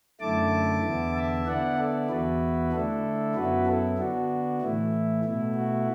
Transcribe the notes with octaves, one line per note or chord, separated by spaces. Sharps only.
F#2 D3 A3 E4 A5 D6
E2 D3 B3 E4
E5 A5
D3 B3 E4 D5 F#5
A4 D5
E2 E3 B3 E4 F#4 B4
D3 A3 D4 E4 A4
F#2 F#3 B3 E4 F#4 B4
E4 A4
D3 B3 D4 F#4
A2 E3 A3 E4
B2 A3 E4
F#4